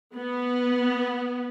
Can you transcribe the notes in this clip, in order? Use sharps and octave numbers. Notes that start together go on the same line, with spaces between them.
B3